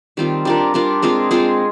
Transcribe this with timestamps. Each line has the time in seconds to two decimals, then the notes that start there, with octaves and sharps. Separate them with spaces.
0.17 D#3 G3 C4 F4
0.45 G3 D4 F4 A#4
0.74 G3 D4 F4 A#4
1.02 G#3 C4 F4 G#4
1.31 G#3 C4 F4 G#4